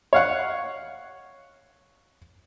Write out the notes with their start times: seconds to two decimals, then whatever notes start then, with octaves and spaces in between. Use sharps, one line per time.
0.13 C#5 F5 F#5